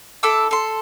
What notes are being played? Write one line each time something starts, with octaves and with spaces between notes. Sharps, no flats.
E4 A4 D6 E6
A4 C6